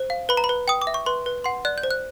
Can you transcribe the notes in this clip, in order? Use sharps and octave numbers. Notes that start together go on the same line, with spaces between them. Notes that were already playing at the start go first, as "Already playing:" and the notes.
Already playing: C5
F5
B4 B5
A#5
B5
B4
G5 D#6
D6
E5
C#6
B4 C6
B4
F#5 C6
D5 F#6
G6
C5
F#6